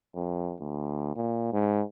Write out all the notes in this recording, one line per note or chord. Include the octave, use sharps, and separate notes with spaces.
F2
D2
A#2
G#2